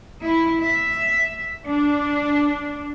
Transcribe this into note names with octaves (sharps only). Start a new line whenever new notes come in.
E4
E5
D4